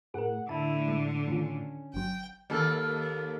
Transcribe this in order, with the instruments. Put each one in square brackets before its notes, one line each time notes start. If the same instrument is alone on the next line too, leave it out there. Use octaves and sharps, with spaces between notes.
[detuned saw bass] A2 [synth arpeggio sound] G#4 A#4 [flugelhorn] F#5
[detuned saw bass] A2 [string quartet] D3 [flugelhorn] E4 [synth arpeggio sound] A5
[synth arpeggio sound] G#3
[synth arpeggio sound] D#3 F4 [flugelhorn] C#4
[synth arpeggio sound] G1 F#3 [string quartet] G5
[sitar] D#2 A#3 A4